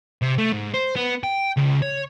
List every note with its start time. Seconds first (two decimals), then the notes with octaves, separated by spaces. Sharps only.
0.22 C3
0.38 A3
0.53 G#2
0.74 C5
0.96 B3
1.24 G5
1.57 C#2
1.82 C#5